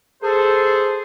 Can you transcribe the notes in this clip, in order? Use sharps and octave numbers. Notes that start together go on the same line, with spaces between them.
G#4 A4 C5